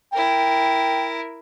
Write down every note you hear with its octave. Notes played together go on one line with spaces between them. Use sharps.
E4 A#4 G5